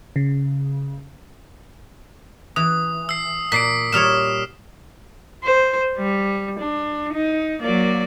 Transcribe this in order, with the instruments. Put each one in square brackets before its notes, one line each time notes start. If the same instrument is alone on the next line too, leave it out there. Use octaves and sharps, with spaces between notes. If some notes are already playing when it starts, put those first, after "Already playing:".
[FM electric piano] C#3
[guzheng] E3 [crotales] D#6
[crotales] E6 C7
[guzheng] A#2 [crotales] B6 C7 D7
[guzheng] A#2 G3 C#5 [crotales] D#6 F6 E7
[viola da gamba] C5
G3
D4
D#4
F#3 A#3 D5